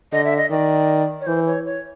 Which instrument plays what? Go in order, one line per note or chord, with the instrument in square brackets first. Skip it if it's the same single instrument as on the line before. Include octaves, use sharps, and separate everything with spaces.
[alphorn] D3 [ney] D#5
[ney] E5
D#5
[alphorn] D#3 [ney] D5
[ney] C#5
[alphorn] E3 [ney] C5
[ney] C#5
C#5